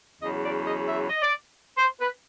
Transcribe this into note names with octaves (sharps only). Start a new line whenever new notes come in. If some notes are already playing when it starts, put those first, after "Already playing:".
E2 C#3 F#3 D#5
D5
D#5
E5
D#5
D5
C5
B4